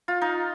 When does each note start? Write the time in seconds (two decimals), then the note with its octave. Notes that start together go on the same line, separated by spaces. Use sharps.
0.08 F4
0.21 D#4